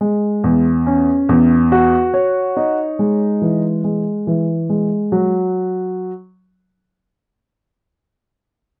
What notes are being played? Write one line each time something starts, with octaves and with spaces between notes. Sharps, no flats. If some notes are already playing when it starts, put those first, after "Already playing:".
G#3
E2
C#4
E2
F#4
C#5
D#4
G#3
E3
G#3
E3
G#3
F#3